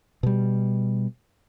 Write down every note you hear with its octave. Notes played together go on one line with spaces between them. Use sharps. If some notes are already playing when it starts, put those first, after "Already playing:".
B2 G3